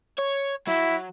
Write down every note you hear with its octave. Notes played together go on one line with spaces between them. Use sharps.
C#5
F#3 E4